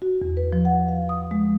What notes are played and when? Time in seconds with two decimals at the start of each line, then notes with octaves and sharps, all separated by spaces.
0.02 F#4
0.22 E2
0.37 B4
0.53 F3
0.65 F#5
0.88 F5
1.09 D#6
1.31 G#3